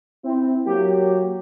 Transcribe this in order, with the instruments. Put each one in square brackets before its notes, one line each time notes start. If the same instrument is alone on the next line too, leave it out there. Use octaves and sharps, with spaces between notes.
[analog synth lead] C4 [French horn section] E4
[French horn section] F#3 A#3 [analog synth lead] G4